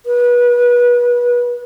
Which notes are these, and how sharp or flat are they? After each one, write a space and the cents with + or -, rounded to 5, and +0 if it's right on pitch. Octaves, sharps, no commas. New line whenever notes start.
B4 -30